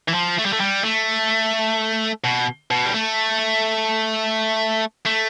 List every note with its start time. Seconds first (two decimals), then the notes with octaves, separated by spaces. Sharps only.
0.08 E3
0.14 F3
0.38 A3
0.45 G3
0.53 A3
0.60 G3
0.84 A3
2.24 B2
2.71 B2
2.86 G3
2.94 A3
5.06 A3